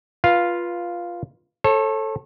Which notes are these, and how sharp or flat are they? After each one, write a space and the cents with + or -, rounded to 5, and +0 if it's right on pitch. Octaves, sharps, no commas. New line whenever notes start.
F4 +0 B4 -25 F5 +0
A4 +0 C#5 -35